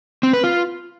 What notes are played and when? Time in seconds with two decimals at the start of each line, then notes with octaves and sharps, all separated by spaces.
0.23 C4
0.33 B4
0.44 F4